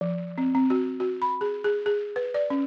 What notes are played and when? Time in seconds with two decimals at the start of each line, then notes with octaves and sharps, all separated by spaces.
0.01 F3
0.38 C4
0.55 C4
0.70 F#4
1.00 F#4
1.22 B5
1.41 G#4
1.64 G#4
1.86 G#4
2.16 B4
2.34 D5
2.50 C#4